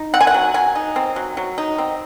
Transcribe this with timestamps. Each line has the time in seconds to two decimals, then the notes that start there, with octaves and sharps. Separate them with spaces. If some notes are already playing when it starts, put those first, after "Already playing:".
Already playing: D#4
0.14 C4 F#5
0.21 G#5
0.27 F#5
0.34 F#3
0.54 F#3 G#5
0.75 D#4
0.96 C4
1.16 F#3
1.37 F#3
1.58 D#4
1.78 C4